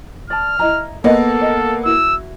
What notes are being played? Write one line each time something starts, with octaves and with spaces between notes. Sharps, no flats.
D5 A5 F6
E4 D#5 A#5
A#3 B3 A4 A#4 D#5
A#4 D#5
E4 F#4 E6